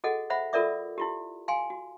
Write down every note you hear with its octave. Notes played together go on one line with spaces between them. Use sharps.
F#4 G#4 A4 D#5 F#5
C5 E5 F#5 B5
F4 A4 A#4 D5 E5 D6
E4 F4 G4
F5 G5 G#5 C6
F#4